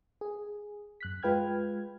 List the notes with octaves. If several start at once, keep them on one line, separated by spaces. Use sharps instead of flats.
G#4
F#2 F#6 B6
G#3 F4 B4 G5 F6 G#6